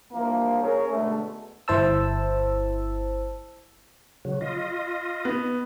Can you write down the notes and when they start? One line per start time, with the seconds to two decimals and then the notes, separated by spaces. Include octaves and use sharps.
0.12 G2 E3 F3 A#3
0.59 C#4 G#4 A#4 C#5
0.89 B2 D3 G#3 A3
1.68 G1 E4 C5 A5 E6
4.25 C#3 F#3
4.41 F4 D#5
5.25 B3